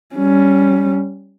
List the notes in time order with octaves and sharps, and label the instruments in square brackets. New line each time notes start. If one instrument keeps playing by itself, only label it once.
[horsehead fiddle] G3 C#4